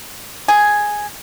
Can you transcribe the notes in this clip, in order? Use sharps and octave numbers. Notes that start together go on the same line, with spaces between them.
G#4